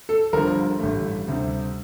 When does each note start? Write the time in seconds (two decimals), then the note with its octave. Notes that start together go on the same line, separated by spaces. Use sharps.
0.09 A4
0.33 G1 G2 D3 F3 A#4
0.79 A1 G2 D3 A3
1.27 D2 C3 G3